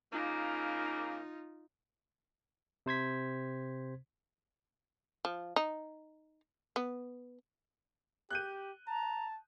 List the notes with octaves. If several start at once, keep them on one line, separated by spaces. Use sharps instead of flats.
C#3 A#3 D#4 F4
C3 C5 G#6 B6
F3
D#4
B3
G4 F#6 G6 D#7
A5 A#5